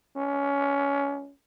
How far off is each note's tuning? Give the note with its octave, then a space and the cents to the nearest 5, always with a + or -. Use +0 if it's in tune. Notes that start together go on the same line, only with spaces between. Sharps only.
C#4 +20